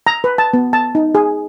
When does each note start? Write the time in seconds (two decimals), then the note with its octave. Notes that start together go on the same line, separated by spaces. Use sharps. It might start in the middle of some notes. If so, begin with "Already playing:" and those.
0.07 A#5
0.24 B4
0.38 A5
0.53 B3
0.73 A5
0.95 D#4
1.15 G#4